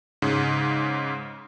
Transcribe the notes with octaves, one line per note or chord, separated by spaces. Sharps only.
G#2 C#3